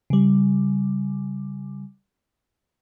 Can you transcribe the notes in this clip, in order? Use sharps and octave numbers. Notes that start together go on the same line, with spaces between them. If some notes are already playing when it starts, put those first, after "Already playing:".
C#3 G3